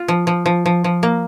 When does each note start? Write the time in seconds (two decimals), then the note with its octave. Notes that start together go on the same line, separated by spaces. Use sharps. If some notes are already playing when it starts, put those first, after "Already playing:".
Already playing: F4
0.08 F3
0.27 F3
0.46 F3
0.66 F3
0.84 F3
1.03 A#3